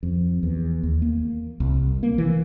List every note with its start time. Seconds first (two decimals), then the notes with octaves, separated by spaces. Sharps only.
0.03 F2
0.43 E2
0.83 D#2
1.02 A#3
1.60 C2
2.03 A#3
2.18 E3